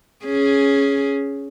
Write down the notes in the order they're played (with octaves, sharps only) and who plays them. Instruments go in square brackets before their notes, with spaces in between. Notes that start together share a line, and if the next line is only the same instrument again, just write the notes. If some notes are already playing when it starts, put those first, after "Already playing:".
[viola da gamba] C#4 G#4